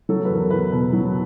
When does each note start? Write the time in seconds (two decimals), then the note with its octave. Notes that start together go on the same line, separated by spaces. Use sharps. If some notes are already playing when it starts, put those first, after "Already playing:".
0.09 F#3 A4
0.25 B4
0.30 E2 A#4
0.50 E2 B4
0.72 B2
0.93 F#3